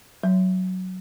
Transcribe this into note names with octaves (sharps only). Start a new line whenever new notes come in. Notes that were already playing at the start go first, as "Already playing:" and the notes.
F#3